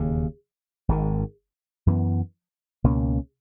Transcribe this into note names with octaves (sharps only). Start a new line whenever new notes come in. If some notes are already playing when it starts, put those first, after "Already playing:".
Already playing: E1 D#2 C#3
G#1 G#2 D#3
F#2 E3 B3
C#2 B2 A#3 C#4